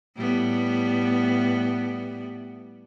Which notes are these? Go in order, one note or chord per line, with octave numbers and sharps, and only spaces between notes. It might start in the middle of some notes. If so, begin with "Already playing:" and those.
A2 G3 B3